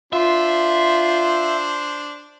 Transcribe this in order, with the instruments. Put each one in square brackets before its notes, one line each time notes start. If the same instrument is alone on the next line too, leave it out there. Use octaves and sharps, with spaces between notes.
[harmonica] D4 C5 [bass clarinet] F4 [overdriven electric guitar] E5